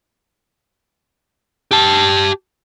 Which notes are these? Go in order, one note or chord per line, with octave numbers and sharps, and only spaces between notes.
G4 A5